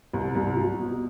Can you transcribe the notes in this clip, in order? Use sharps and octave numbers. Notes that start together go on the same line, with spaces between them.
C2
C2
F#3
B2